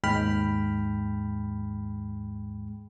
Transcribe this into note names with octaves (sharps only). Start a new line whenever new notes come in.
D#2 G#2 G#3 G5 B5 F6